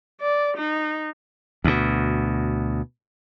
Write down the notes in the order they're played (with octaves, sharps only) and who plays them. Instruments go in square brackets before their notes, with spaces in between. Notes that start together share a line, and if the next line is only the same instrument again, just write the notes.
[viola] D5
D#4
[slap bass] D2 B2